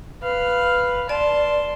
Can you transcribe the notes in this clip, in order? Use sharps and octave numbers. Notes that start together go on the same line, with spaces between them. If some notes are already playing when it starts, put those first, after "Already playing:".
B4 F5
D5 A5 C6